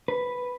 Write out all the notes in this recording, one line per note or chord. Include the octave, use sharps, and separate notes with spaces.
B4